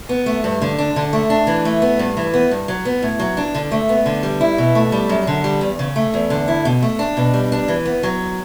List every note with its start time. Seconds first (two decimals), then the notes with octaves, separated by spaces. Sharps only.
0.09 B3
0.26 A3
0.44 G2
0.61 D3
0.78 D4
0.96 D3
1.13 A3
1.30 D4
1.47 E3
1.65 A3
1.82 B3
1.99 G2
2.17 E3
2.34 B3
2.51 G2
2.68 F#3
2.85 B3
3.02 A2
3.19 F#3
3.37 D4
3.55 D3
3.72 A3
3.89 B3
4.06 D3
4.23 G3
4.41 E4
4.58 B2
4.75 A3
4.92 G3
5.09 F#2
5.27 D3
5.44 G3
5.61 E2
5.79 C#3
5.96 A3
6.14 E2
6.30 D3
6.48 E4
6.65 B2
6.82 A3
6.99 D4
7.17 B2
7.33 G3
7.52 D4
7.68 E3
7.86 B3
8.03 F#3